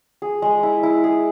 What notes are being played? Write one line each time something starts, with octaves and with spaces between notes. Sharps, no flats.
G#4
G#3
E4
E4
G#4